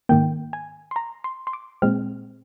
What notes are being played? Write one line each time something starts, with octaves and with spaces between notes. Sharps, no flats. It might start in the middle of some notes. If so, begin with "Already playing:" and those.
G#2 D#3 A#3 G5
G#5
C6
A#5
C6
C6
D6
A#2 G#3 C4 F6